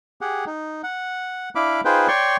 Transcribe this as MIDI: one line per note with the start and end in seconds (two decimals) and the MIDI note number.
0.21 0.45 67
0.21 0.45 68
0.21 0.45 78
0.46 0.82 63
0.83 1.49 78
1.55 1.81 62
1.55 1.81 64
1.55 1.81 77
1.55 1.81 83
1.55 1.81 86
1.85 2.08 63
1.85 2.08 65
1.85 2.08 68
1.85 2.08 71
1.85 2.08 72
1.85 2.08 79
2.08 2.37 73
2.08 2.37 74
2.08 2.37 79
2.08 2.37 84
2.08 2.37 85